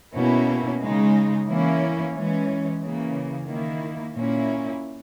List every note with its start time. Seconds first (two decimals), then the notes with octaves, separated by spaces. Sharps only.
0.14 B2 A#3 C#4 E4
0.80 C#3 G#3 D#4
1.47 E3 A#3 C#4 E4
2.13 E3 G#3 C#4
2.80 C#3 E3 A#3
3.47 D#3 A#3 E4
4.14 A#2 A#3 C#4 E4